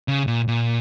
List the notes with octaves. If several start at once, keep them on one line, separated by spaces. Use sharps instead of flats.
C#3
A#2
A#2